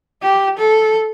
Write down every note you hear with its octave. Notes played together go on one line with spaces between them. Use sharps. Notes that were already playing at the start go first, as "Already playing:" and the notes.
G4
A4